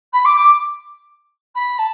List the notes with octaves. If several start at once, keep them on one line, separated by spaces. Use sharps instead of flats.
B5
D6
D6
B5
A5